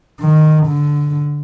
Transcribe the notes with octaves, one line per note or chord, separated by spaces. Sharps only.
D#3
D3